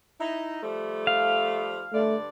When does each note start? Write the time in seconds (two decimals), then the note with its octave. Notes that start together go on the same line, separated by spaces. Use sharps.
0.19 D#4 E4
0.62 F3 G3 A3
1.07 F5
1.93 G2 D3 A3 D5